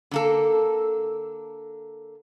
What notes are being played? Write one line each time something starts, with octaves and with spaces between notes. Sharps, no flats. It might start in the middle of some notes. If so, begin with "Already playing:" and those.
D3 A#3 A4